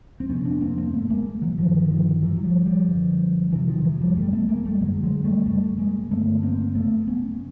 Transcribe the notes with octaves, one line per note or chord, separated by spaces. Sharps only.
C4
F2 C3 B3 C#4
C4 D4
A#3 C4
A#3 C4
G#2 A3 B3
G#3 A#3
E3 F#3
G2 D3 D#3 F3
D#3 F3
G#2 E3 F#3
F#3
F3 G3
F3 G3
F#2 D3
F2 C3 E3 F#3
D#3 F3
E3 F#3
F3 G3
F#2 C#3 G3 A3
A3 B3
G#3 A#3
G3 A3
F#2 D3 F#3 G#3
F#3 G#3
G3 A3
F#2 C#3 G3 A3
G#3 A#3
G2 D3 A3 B3
A#3 C4
F#2 C#3 A3 B3
B3 C#4